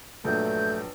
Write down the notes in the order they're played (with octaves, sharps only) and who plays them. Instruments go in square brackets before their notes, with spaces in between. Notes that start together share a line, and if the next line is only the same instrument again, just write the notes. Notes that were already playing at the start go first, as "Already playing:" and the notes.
[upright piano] A#1 G2 F#3 [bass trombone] A3 [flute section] G6